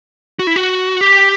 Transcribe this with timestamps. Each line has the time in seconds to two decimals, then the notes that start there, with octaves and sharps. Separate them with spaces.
0.39 F#4
0.47 E4
0.56 F#4
1.01 G4